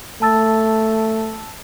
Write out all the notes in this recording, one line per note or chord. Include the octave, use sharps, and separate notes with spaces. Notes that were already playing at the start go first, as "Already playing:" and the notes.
A3 A5 E6 A6